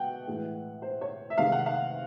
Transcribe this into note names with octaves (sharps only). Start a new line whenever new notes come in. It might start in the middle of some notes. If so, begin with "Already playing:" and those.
Already playing: B2 F#5 G5
A2 E3 G#3
C5
C#5
E5
C3 D#3 G#3 F5
F#5
F5